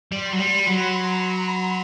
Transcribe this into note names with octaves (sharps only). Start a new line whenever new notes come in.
G3 C6
F#3
G3
B5
F#3
A#5
A#5